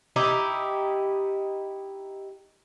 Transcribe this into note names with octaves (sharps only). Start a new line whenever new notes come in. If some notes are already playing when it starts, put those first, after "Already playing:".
D#4 E4 G4